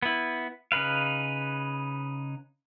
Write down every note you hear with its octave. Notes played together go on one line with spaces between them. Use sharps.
B3 E4
C#3 D#4 B4 F5